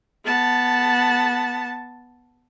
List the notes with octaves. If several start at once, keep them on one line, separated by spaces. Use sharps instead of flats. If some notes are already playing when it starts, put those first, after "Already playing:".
B3 A5